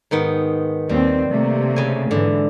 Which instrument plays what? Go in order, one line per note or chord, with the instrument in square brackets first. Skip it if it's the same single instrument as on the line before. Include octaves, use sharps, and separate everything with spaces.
[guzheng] G#2 D#3 B3
[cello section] D#2 C4 [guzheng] G3
[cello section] C3 A3 A#3
[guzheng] C#3 G#5
[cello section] G#2 E3 [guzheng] D3